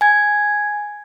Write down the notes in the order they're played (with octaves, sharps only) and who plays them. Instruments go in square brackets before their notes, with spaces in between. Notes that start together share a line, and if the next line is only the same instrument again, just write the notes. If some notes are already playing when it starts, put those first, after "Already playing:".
[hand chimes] G#5 G#6